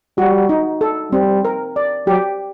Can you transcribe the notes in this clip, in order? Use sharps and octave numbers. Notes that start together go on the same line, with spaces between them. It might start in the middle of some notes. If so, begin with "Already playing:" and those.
G3 F#4
D#4
A4
G3 C4
A#4
D5
F#3 G4